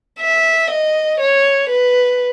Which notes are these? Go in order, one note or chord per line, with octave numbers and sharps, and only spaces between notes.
E5
D#5
C#5
B4